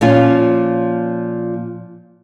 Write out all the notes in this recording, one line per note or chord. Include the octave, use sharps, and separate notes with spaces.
A#2 F3 C#4 F4